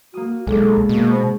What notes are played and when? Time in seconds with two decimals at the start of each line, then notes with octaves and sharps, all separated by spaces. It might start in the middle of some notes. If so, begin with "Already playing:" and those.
0.14 A#3 F#4 D#6
0.47 B1 G#3 D4 A4
0.89 B2 A#3
1.11 C5